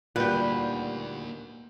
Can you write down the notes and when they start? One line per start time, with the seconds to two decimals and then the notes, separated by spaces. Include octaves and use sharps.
0.16 D2 A#2 G3 A#3 D#4 F#4 B4 G6